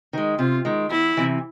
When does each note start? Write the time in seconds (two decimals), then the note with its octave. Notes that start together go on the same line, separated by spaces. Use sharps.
0.13 D#3 G#3
0.39 C3 F4
0.65 D#3 G#3
0.90 E2 E4
1.17 C3 E3